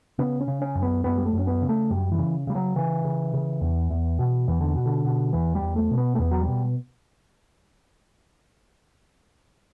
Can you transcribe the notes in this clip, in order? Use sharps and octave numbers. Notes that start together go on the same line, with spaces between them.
C#3 B3
C#4
C#3
C#4
F#2
B3
F#2 B3
G3
A3
F#2
C#4
B3
C#3
A3
F#2 G3
E3
C#3
C#3 G3
F#3
C#3 E3
C#3
C#3
E2
E2
B2
E2 E3
D3
B2
D3
B2
E2 E3
G3
E2
A3
B2
B3
A3
E2 B3
F#3
G3
B2